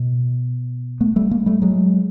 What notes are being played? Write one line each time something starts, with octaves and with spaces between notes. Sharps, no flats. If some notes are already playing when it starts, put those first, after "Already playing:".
Already playing: B2
A3 B3
G3 A3
G#3 A#3
G3 A3
F#3 G#3